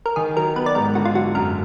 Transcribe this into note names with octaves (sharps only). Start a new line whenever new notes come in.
A#4
D#3 G#4
F#3 A#4
B3 B4
D5
G#2 A#4
D3 F#4
F4
F#3 F#4
F#2 A#4